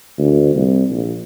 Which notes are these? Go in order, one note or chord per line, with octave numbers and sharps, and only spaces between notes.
D2
C2
A#1